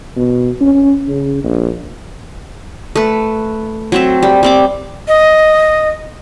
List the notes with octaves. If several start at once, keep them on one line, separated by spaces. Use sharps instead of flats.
B2
C#4
C#3
A#1
A3 B4
F#3 C4 E5
G3
G3 C4 D6
D#5